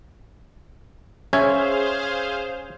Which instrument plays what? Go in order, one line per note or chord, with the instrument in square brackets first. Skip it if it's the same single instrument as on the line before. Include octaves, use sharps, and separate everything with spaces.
[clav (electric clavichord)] C#4 [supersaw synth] G#4 C5 F5 [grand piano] E5 G#6